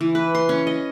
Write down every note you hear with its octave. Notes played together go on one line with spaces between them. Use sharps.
E3
B4
C6
C#4
D#5